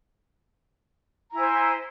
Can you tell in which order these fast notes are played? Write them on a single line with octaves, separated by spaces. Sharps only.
A#5 E4 G#5 C5